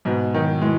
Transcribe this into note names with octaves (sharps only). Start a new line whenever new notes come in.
G#2 B2
D#3 F#3
E3 G#3